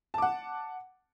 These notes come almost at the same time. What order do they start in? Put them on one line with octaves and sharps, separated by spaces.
A5 D6 F#5